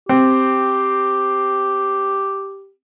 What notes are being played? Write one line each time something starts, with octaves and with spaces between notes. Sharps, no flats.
C4 G4